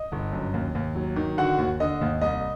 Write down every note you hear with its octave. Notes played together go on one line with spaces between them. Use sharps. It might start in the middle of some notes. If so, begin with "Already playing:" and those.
Already playing: D#5
G1
F#2
D#2
D#2
F#3
D#3
D3 F#4 F#5
D#2
D3 D#5
D#2
C2 D#5